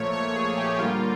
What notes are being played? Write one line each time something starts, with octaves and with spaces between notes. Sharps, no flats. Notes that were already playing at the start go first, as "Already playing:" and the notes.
Already playing: A#2 F3 A3 C#5
C#5
G#4
G4
D3 G3 A#3 F4